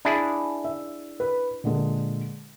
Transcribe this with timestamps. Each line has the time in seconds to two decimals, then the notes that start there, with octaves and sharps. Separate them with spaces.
0.05 D4 E4 G#4
0.64 E5
1.20 B4
1.64 A#2 D3 G#3